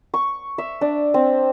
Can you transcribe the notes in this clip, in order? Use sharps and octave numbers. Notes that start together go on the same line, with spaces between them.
C#6
E5
D4
C4